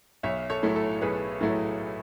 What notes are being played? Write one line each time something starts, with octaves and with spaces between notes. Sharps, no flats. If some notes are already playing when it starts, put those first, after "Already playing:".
B1 C#5 E5
A4 C#5
A2 F#3 A3 E4
A4
B1 G#4 B4
A2 F#3 A3 E4